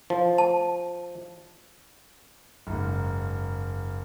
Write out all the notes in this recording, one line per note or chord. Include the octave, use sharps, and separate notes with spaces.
F3
A5
F#1 G#2